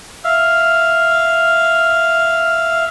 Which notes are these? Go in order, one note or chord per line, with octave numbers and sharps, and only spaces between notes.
E5 F5